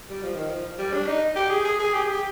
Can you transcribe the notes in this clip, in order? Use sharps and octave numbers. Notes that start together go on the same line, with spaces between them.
G3
F3
D#3
F3
G3
D4
D#4
G4
G#4
G#4
G#4
G4
G#4
G4